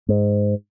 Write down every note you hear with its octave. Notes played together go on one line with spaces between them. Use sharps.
G#2